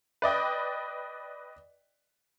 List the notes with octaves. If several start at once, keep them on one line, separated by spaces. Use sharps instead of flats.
B4 D5 D#5 G5